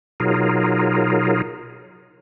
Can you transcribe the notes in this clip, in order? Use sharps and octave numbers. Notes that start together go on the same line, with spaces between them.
B2 F#3 D#4 F4 G#4 A#4